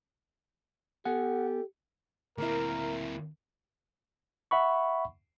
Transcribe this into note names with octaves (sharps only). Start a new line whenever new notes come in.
B3 G4 A4 F#5 G#5
D2 A#3 C4 E4 A#4
E5 F#5 B5 C#6